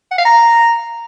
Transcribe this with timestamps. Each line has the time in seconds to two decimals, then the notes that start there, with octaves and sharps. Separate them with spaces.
0.11 F#5
0.18 F5
0.25 A#5